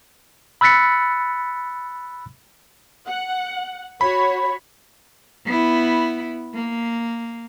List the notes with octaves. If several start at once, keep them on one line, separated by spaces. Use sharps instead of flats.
B5 E6 F#6 A6 B6 C#7
F#5
F#4 C#5 B5
B3 E4
A#3